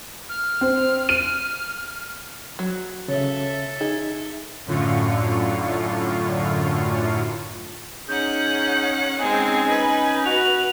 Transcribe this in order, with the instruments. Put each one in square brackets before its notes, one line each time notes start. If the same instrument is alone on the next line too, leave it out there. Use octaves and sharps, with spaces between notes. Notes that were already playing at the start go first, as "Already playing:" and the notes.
[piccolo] F6
[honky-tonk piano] C4
D#7
[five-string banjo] F#3
[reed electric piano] C#3 [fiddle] A4 E5 [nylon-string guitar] C#5
[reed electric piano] D#4 [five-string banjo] G#4
[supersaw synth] F#2 A2 D3 F4 C#6
[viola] C#4 F#5 [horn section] D#4 G#4 [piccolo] G6
[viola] G#3 C4 [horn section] C#4 D#4 [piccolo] G#5
[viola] B4
[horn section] F#4 [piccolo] F7